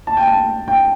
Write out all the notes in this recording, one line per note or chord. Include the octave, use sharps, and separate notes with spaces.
A5
G5
A5
G5